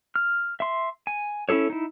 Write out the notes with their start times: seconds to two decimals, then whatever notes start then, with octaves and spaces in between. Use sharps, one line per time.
0.16 F6
0.60 E5 C6
1.07 G#5
1.49 C#4 E4 G#4 A4 C#5
1.70 D#4 E4